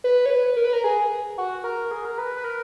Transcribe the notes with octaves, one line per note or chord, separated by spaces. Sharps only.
B4
C#5
B4
A#4
B4
A#4
G#4
F#4
A#4
G#4
A#4
B4
B4
A#4